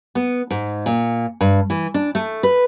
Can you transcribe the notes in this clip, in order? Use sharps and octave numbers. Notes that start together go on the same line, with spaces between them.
B3
G#2
A#2
G2
E3
D4
A3
B4